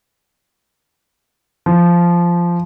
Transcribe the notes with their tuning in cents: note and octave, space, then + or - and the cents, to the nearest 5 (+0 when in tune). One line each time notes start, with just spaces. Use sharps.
F3 -10